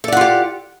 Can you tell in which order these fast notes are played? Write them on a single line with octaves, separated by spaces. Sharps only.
A4 D5 F#5 F4 G4